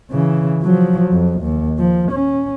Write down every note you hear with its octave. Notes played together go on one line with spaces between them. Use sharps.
C#3 E3
F3 F#3
F2
D#2
F3
C#4